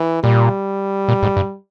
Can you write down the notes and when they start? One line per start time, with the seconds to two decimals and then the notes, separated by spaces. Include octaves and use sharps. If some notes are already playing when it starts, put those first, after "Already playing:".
Already playing: E3
0.24 A#2 G3
1.09 A#2
1.23 G#2
1.37 G2